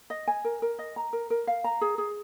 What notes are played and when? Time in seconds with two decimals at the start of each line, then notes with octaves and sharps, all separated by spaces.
0.10 D#5
0.27 G#5
0.44 A#4
0.62 A#4
0.79 D#5
0.96 A#5
1.13 A#4
1.30 A#4
1.47 F5
1.64 A#5
1.81 G#4
1.98 G#4